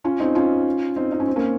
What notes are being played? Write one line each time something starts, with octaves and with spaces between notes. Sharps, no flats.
C#4 F4
C4 D#4
C#4 F4
C4 D#4
D#4
C#4
C4
A#3 C#4